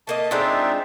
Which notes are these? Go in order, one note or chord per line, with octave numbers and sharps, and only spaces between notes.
A3 A#3 D#5 A5
G#3 C4 D4 D#4 F4 E5